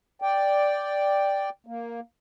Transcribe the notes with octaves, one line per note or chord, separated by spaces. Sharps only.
D5 G5
A#3